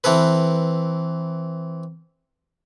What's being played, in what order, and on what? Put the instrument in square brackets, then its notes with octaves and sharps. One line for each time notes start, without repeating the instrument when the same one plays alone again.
[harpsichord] E3 C4 A4 B4